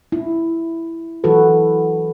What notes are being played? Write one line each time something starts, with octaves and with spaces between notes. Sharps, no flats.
E4
E3 F#3 F#4 A4 B4